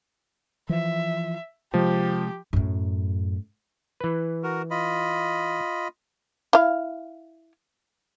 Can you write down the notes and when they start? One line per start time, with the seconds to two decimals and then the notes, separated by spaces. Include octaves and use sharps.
0.69 E3 F3 E5
1.74 C3 F3 G#3 G4
2.53 F#2 A2
4.00 E3 B4
4.43 F#4 A#4
4.70 F4 D#5 B5
6.53 E4 F5